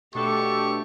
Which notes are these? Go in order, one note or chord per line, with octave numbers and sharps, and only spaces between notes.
B2 A3 D4 G4 A4 C#6